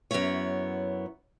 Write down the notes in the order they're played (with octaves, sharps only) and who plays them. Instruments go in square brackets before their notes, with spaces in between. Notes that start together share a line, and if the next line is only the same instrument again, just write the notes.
[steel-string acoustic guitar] F#2 B2 B3 E4 C#5